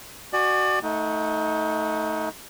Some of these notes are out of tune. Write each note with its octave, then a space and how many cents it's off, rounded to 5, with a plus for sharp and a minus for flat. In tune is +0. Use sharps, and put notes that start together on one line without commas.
F#4 +15 D5 +30 G#5 +0
A3 +0 D#4 +25 F#5 -20